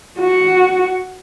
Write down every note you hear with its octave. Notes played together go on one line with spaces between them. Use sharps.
F#4